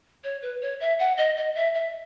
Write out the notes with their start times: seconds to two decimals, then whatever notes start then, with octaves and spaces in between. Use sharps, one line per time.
0.24 C#5
0.42 B4
0.61 C#5
0.80 E5
0.99 F#5
1.17 D#5
1.37 D#5
1.55 E5
1.74 E5